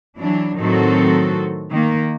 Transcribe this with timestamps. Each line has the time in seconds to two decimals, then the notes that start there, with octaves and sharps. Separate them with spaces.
0.18 E3 F#3 D4
0.58 A2 D#3 F#3 C4 F#4 A4
1.71 D#3 A#3